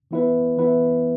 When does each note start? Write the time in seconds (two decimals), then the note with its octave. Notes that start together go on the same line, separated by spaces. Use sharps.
0.11 E3 B3 E4 B4
0.58 E3 B3 E4 B4